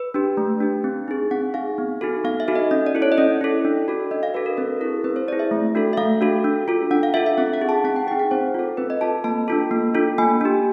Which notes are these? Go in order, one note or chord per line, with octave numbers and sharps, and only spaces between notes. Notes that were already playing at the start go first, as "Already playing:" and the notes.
Already playing: B4
D4 G4
A3
D4 G4
C4
D#4 G#4
C4 F#5
D#4 G#4 F5
B3
D#4 F#4 A4
B3 F5
E5
D#4 F#4 A4
D#5
C#4 D#5
D5
E4 A4
C#5
D#5
C#4 D5
E4 A4
D4
F#4 A4
D4 D#5
F5
F#4 A4 B4
A#4
C4 B4
E4 G#4 A#4
C4 B4
C5
E4 G#4 D5
E5
A3
D4 F#4 A4
E5
A3 F5
D4 F#4 A4
D4
F4 A4
D4 F#5
F5
F4 A4 E5
E5
C4 F#5
F#5
D#4 G#4
A5
C4 F#5
G5
D#4 G#4 G5
F#5
C4 C5
F4 A4
C4 B4
D#5
F4 A4 A5
A#3 A5
D4 F4 A4
A#3
D4 F4 A4
A#3 G#5
D4 G4